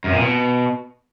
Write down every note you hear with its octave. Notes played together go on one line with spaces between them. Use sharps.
F#2
A#2
B2